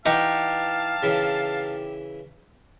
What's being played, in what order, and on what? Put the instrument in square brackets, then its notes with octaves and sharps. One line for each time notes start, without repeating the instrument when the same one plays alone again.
[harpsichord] E3 F#5 C#6 [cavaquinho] D#4 G4 [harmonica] F5 A5
[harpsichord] C#3 E3